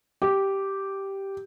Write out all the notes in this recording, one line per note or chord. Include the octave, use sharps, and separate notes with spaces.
G4